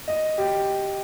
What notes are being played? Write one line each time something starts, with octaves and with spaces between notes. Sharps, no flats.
D#5
G4